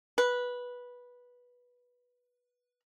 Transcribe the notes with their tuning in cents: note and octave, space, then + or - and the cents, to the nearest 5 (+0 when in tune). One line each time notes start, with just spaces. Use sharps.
B4 -10